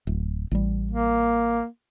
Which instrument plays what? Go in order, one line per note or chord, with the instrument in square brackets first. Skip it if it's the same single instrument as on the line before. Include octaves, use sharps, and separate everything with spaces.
[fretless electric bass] D1
A1 G3
[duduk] A#3